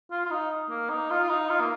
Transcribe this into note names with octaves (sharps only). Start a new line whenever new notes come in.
F4
F4
D#4
A#3
D#4
F4
F4
D#4
F4
A#3